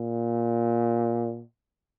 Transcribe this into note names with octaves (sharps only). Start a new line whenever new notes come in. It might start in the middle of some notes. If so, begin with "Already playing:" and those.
Already playing: A#2